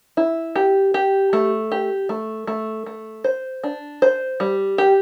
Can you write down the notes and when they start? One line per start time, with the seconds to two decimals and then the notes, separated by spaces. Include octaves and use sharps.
0.17 E4
0.56 G4
0.94 G4
1.33 A3
1.72 G4
2.09 A3
2.47 A3
2.86 A3
3.24 C5
3.64 D4
4.02 C5
4.40 G3
4.78 G4